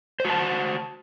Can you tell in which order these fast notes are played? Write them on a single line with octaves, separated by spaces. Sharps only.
C5 F#4 A5